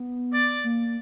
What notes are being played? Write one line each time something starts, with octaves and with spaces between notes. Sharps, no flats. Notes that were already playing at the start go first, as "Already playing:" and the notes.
Already playing: B3
D5
A#3